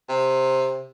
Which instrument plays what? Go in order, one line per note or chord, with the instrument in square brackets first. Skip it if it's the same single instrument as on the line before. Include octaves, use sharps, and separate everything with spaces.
[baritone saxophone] C3